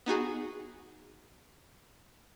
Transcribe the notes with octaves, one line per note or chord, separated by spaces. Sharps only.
B3 D#4 F#4 G#4